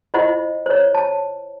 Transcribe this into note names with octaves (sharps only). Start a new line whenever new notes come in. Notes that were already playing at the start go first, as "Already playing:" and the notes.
E4 F4 C5 D#5 F#5
C5 C#5
A5